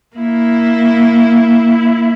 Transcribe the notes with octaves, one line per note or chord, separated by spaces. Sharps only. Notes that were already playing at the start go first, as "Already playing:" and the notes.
A#3 E4